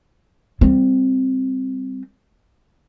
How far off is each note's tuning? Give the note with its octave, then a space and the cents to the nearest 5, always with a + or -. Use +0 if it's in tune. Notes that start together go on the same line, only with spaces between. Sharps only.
G3 +10 C4 +0